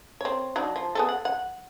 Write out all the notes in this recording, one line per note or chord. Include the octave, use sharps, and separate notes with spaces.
C4 C#5
F#3 D4 D#4
F3
B3 G#4 A4
F#5
F#5